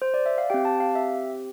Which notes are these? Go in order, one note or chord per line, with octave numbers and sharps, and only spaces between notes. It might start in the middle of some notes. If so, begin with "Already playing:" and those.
C5
D5
E5
F5
C4 G4 G5
A5
F5
E5